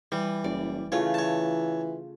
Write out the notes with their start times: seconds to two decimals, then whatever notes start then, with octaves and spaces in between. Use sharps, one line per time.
0.12 E3 G3
0.44 F#1 D5
0.92 C#3 E3 A3 F4 C#5
1.14 C#5 A5